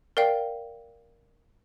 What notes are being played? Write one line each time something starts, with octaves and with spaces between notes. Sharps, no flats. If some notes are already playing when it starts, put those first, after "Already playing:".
A#4 D5 F5 G5